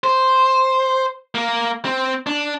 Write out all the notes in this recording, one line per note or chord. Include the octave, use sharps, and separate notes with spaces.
C5
A#3
C4
D4